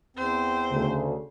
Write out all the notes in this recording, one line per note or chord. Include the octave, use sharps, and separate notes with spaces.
E2 C4 C5
D2 C#3